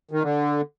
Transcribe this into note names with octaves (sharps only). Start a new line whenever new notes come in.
D#3
D3